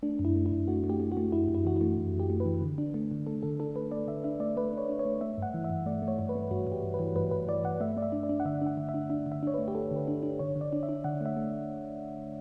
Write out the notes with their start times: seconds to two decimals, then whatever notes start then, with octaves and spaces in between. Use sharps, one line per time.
0.03 A3 D4
0.19 F#2
0.25 E4
0.35 A3
0.46 E4
0.52 F#2
0.68 A3 F#4
0.84 A3
0.89 G4
1.00 A3
1.12 F#4
1.17 A3
1.32 F#2 E4
1.48 F#2
1.54 E4
1.65 E3 F#4
1.76 A3 E4
1.97 F#2
2.13 F#2
2.19 G4
2.30 A3
2.40 B4
2.46 E3
2.62 D3
2.78 D4
2.94 A3
3.11 D3
3.27 A3 A4
3.43 D3 A4
3.60 D4 A4
3.75 A3 B4
3.91 A3 D5
4.08 D3 E5
4.24 D4 E5
4.40 A3 D5
4.56 A3 B4
4.73 A3 C#5
4.89 D4
4.99 C#5
5.05 A3
5.21 A3 E5
5.38 G2 F#5
5.54 E3
5.64 E5
5.70 G2
5.86 A3 D5
6.02 A3
6.08 C#5
6.19 G2
6.29 B4
6.35 A3
6.51 G2 F#4
6.67 G2
6.72 G4
6.83 G2
6.94 B4
6.99 E3
7.16 G2 B4
7.31 G2 B4
7.48 E3 D5
7.64 G2 F#5
7.80 A3 E5
7.97 A3 D5
8.02 E5
8.12 D4
8.23 D5
8.29 D4
8.40 F#5
8.45 D3 E5
8.61 D4
8.67 F#5
8.77 D3
8.89 E5
8.94 D4
9.10 D4 E5
9.26 D3
9.32 E5
9.43 D4 C#5
9.54 A3 B4
9.68 G4
9.75 A3 A4
9.91 D3
9.96 B4
10.08 D4
10.23 D4
10.39 D3 C#5
10.56 D3
10.61 D5
10.73 D4
10.83 E5
10.89 D4
11.04 D3 F#5
11.21 A3 E5
11.37 A3